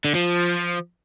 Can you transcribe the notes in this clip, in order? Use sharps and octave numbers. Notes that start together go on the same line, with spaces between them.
D3
F3